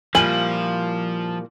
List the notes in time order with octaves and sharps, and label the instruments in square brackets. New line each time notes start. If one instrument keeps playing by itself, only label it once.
[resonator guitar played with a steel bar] A#2 G3 A#3 [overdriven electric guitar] F3 [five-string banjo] E4 G#5 [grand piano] F#7